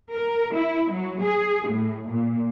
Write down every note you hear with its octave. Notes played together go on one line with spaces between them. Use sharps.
A#4
E4
F#3
G#4
A2
A#2